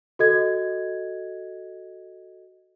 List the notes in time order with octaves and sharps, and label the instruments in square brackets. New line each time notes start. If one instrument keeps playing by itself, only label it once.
[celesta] F#4 A4 D#5 G#6